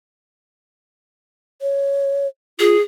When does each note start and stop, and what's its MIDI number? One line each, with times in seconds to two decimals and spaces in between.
1.62 2.27 73
2.59 2.76 65
2.59 2.81 68